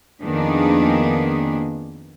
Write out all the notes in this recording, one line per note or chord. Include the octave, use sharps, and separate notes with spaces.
F2 D#3 A#3 B3 D4 G#4